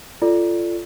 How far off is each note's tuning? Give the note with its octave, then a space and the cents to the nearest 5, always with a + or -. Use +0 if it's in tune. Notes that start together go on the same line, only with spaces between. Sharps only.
F4 -20 A4 +0 D5 +0